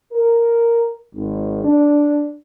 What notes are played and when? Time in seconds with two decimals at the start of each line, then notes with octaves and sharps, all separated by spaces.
0.11 A#4
1.14 G#1
1.64 D4